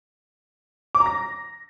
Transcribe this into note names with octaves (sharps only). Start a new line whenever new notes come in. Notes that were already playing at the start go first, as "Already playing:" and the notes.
D6
A#5
A#6